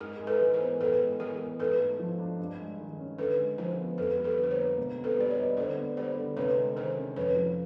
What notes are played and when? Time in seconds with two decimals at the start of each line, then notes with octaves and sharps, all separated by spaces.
0.01 G#2 G#4 A#4
0.21 G#3
0.27 A4 B4
0.41 E3
0.54 A#4 C5
0.61 B3
0.81 A2 A4 B4
1.01 G#3
1.20 E3 G#4 A#4
1.40 B3
1.59 G#2 A4 B4
1.80 A3
1.99 F3
2.19 D4
2.39 G2
2.59 G#3
2.79 D#3
2.98 C#4
3.19 D3 A4 B4
3.39 G#3
3.58 F3 A#4 C5
3.78 B3
3.98 F2 A4 B4
4.18 G3
4.24 A4 B4
4.38 D3
4.44 C5
4.51 B4 C#5
4.58 A#3
4.78 B2
4.98 C4
5.04 A4 B4
5.17 G3 D5
5.30 B4 C#5
5.37 D#4
5.57 D3 C5 D5
5.77 B3
5.97 G3 C5 D5
6.16 D3
6.37 C3 B4 C#5
6.56 G#3
6.76 D#3 A#4 C5
6.96 C#4
7.16 F2 B4 C#5
7.36 F3